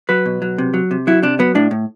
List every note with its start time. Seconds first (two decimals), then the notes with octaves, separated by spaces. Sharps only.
0.09 F#3 B4
0.25 B2
0.42 F#3
0.58 C3
0.74 F#3
0.91 C3
1.07 F#3 E4
1.22 C3 D4
1.39 F#3 B3
1.55 A2 D4
1.71 A2